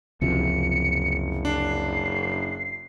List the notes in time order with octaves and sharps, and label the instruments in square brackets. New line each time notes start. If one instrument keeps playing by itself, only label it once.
[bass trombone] F#1 [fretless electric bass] C#2 C3 F3 [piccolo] C#7
[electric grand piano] D4 [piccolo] C7